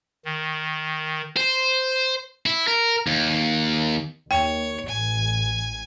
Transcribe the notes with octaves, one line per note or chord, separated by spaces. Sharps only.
D#3
C5
E4
A#4
D#2
D#2 C#5 G5
A1 G#5